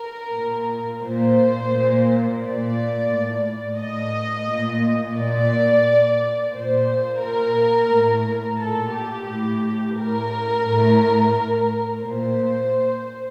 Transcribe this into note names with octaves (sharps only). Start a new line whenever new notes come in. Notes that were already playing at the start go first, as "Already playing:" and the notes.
Already playing: A#4
A#2
A#2 C5
A#2
A#2 D5
A2
A2 D#5
A#2
A#2 D5
A#2
A#2 C5
A#2 A#4
A2
A#2 A4
G4
A2 G4
A2 A#4
A2
A2
A#2 C5